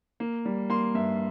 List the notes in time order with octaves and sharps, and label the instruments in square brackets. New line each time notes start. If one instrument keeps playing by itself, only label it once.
[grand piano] A#3
G3
A#3 C6
G2 E5